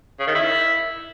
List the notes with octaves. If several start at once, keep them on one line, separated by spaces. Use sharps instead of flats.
C#3
D#3
E4